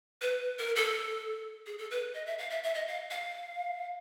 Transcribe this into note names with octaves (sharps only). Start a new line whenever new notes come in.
B4
A#4
A4
G#4
A4
B4
D#5
E5
F5
E5
E5
D#5
F5
F5